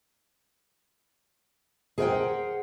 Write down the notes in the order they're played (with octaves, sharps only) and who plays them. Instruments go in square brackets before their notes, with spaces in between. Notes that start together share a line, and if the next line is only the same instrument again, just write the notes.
[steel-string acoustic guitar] G#4 A#4 C5 D5 F#5 G5